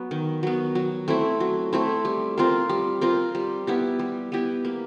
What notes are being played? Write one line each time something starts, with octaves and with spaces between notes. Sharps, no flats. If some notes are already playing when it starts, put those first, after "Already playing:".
Already playing: F#3 B3
D#3
F#3 B3
F#3
A3 C4 E4
F#3
A3 C4 E4
G3
C4 F4 A#4
G3
C4 F4 A#4
G3
B3 E4 G4
G3
B3 E4 G4
A#3